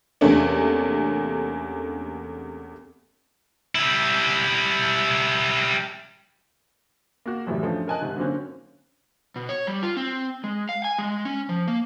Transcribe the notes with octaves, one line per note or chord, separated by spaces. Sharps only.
E2 C3 A3 A#3 C#4 D4
G3 E4
A#3 F#4
G#1 F#2 A2 E3 G3
F3 G3 A3 C#4 D4
A#4 D#5 G#5 A5 F#6
G#2 C3 D#3
D3 F#3 A#3 C4 C#4
B2
C#5
G3
F4
C4
G#3
F5
G#5
G#3
C#4
F3
A#3